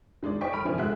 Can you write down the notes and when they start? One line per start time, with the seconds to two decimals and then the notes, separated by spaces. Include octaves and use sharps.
0.23 D#3 G#3 D#4 D5
0.41 D#4 C5 D5 G5 C#6 B6
0.53 G1 B5 F6 D7
0.65 D#3 F3 C4 D4 E4 G#5
0.78 D2 G#3 A3 F#4 E5 F#6